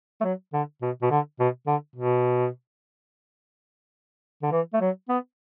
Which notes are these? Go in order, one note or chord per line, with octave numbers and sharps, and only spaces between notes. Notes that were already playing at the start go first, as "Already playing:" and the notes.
A3
F#3
D3
B2
B2
D3
B2
D3
B2
D3
E3
A3
F#3
B3